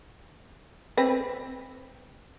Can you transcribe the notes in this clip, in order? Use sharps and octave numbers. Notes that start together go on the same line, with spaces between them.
C4 B4